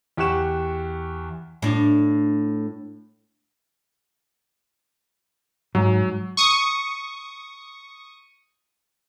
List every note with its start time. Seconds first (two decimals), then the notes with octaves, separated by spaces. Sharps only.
0.17 E2 G4 F#5 C#6 F#6 E7
1.62 A2 D4
5.75 G#2 F#3
6.37 C#6 D#6